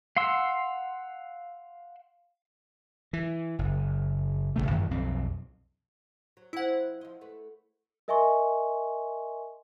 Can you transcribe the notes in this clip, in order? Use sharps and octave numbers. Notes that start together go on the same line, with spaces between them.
F5 F#5 C6 E6
E3
F#1
D1 G2 C#3 A3
F#2 D#3 E3
B1 F2 C4
F#3
F3 C4 E4 F#5
F3 D#5
A3 B4
A#4 D#5 E5 G#5 C6 C#6